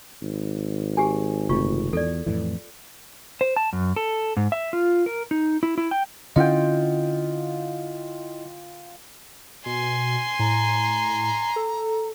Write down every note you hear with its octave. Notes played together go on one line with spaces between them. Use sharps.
G#1
G4 G#4 G#5
F#1 C3 A3 F4 C#6
E2 A4 D5
F2 A2 E3
C5
A5
F#2
A4
G#2
E5
F4
A#4
D#4
E4
E4
G5
D3 C#4 E4 F4 D#5 F#5 G5
B2 G#5 C6
A2 A#5
A4